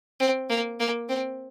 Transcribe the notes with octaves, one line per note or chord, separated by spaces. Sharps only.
C4
A#3
A#3
C4